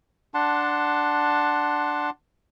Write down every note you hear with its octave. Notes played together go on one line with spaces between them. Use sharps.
D4 F#5 A5 C6